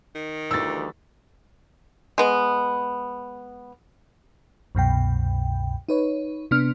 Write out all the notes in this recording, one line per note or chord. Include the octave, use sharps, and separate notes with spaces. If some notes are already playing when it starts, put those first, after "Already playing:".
D#3
D2 E3 G3 D#4 E6 A6
G#3 B3
C2 F#2 B2 G5
D#4 B4 C#5
C3 B3 D4 F6